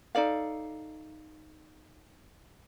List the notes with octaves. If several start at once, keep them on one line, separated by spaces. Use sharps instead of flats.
D#4 A4 D5 F5